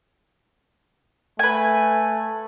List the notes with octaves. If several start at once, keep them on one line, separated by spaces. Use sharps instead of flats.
A3 B4 G#5